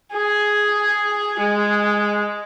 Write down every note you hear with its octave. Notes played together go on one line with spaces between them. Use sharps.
G#4
G#3